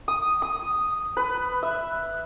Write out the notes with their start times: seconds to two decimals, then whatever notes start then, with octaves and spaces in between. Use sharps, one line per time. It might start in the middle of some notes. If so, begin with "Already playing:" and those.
0.08 D#6
0.42 D#6
1.17 B4
1.63 E5